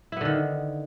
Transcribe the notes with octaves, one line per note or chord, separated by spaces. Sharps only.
D3 D#3 B3 E4